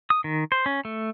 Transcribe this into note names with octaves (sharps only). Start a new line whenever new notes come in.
D#6
D#3
C5
C#4
A3